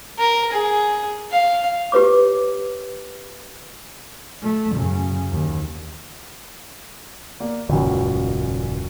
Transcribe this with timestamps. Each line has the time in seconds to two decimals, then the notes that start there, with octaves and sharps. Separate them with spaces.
0.19 A#4
0.52 G#4
1.32 F5
1.92 G4 B4 C#5 D6
4.43 A3
4.76 F#2 C#3
5.32 D#2
7.40 A#3 D5
7.69 D#1 C#2 F#2 C#4